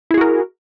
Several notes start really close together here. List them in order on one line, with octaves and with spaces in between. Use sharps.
E4 G#4 F#4 A#4